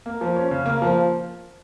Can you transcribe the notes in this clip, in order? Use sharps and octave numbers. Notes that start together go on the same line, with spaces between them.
A#3
F3
C#4
C#3
A#3
F3